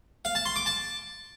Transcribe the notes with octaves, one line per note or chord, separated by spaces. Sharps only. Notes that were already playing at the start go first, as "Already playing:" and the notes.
F5
A5
C6
D6
A5